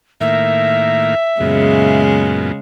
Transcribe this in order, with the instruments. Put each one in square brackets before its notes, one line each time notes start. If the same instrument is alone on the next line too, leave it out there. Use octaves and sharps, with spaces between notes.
[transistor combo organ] A2 D#3 A#3 [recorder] E5
[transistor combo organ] F#2 A#2 B3 [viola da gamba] C#3 G#3